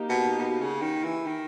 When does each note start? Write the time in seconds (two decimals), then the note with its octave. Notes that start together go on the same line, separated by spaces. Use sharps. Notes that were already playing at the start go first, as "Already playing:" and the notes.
Already playing: A#3 D#4 G4
0.10 B2
0.38 B2
0.61 C#3
0.82 D#3
1.04 E3
1.26 D#3